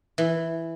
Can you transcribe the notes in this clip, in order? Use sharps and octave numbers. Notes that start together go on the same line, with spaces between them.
E3